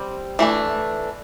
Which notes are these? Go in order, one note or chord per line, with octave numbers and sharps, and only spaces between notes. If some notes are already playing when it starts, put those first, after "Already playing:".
Already playing: G3 C4
E3 A3 D4